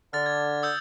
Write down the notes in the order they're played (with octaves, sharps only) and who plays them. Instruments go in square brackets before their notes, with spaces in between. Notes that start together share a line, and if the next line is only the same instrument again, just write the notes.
[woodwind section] D3 [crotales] F6 A6
[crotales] G#6
D#6 E6 G6